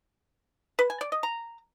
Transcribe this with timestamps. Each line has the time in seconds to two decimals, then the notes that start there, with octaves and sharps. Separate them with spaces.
0.79 B4
0.90 G#5
1.01 D5
1.12 D#5
1.23 A#5